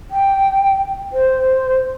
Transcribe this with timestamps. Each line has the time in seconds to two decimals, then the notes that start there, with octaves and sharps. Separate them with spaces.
0.11 G5
1.13 C5